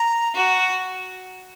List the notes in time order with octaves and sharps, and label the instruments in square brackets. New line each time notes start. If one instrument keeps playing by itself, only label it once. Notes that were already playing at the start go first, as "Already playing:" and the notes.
Already playing: [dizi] A#5
[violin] F#4